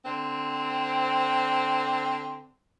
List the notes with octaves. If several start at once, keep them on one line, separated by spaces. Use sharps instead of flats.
D3 C4